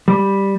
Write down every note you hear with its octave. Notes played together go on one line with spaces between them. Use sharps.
G3